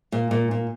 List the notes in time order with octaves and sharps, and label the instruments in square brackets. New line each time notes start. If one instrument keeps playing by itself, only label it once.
[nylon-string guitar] A#2
A#2
A#2